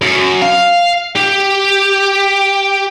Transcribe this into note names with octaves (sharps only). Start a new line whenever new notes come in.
F#2
F5
G4